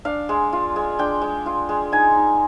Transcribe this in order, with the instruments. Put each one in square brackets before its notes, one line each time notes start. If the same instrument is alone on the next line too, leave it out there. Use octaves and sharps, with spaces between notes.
[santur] D4 F5
G#3
F4
G#3
D4 G5
G#3
F4
G#3
D#4 G#5
D#4